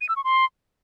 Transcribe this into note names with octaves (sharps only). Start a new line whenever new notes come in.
D#7
E6
C#6
C6